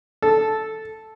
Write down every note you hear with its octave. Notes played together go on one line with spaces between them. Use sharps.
A4